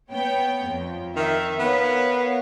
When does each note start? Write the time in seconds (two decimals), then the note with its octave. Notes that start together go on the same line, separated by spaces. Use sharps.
0.11 B3 C#5 G5
0.67 F2
1.16 D#3 E5
1.59 B3 A#4 C#5 F5